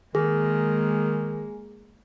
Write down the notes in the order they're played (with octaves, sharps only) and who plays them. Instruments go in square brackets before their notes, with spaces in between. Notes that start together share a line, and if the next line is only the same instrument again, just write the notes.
[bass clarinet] D#3 [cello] G#3 A#3 [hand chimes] G#4